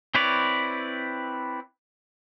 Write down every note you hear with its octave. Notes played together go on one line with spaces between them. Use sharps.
C4 E4 B4 C#5 D5